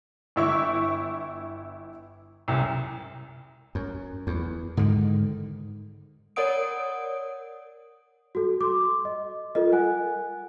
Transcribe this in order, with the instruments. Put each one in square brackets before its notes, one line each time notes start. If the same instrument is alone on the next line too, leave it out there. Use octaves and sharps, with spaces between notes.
[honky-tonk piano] G1 E4 C#6
C2 F#2
[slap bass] F#2
E2
G#2 D3 D#3
[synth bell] A#4 C#5 D5 F#5 D#6 D7
[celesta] F#4 A4
C6 D6
D#5
F4 A4 A#4 D#5
F#5 G#5 F#6